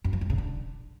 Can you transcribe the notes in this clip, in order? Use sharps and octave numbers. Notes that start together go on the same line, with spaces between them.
F#2
F3
G2
C#3
D3